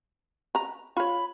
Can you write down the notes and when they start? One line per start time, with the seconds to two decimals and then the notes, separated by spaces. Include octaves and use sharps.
0.55 A#5 B5
0.97 F4 C#5 B5